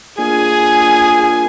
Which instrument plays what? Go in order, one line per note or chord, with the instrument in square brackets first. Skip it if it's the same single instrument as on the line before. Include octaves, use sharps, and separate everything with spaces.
[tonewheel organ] A#3 D4 F4 [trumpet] G#4 [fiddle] G#5